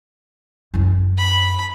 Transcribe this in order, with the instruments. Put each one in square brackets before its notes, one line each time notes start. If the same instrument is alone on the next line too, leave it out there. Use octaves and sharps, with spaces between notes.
[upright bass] F#2 E4
[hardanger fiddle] B5